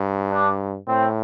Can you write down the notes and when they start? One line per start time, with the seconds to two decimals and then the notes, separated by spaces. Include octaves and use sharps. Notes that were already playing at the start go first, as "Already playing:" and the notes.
Already playing: G2
0.32 D4
0.88 A2 C4